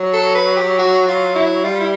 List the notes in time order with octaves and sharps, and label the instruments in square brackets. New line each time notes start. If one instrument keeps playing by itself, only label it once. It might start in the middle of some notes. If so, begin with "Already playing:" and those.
Already playing: [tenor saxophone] F#3
[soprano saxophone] A4
B4
G4
F#4
F4
E4
[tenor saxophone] G3 [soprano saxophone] F4
[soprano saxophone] E4